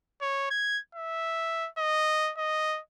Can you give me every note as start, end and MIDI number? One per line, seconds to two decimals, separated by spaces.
0.21 0.48 73
0.50 0.79 92
0.95 1.68 76
1.78 2.32 75
2.37 2.80 75